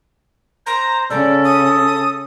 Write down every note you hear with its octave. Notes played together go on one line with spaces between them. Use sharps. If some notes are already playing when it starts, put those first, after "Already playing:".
C5 A#5
C#3 C#4 A4 D5
D#6